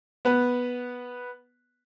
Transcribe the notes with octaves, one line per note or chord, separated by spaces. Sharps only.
B3 B4